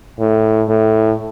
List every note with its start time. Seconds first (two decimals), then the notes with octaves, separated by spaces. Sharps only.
0.20 A2
0.69 A2